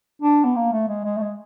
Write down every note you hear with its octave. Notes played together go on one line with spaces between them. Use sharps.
D4
B3
A#3
A3
G#3
G#3
A3
G#3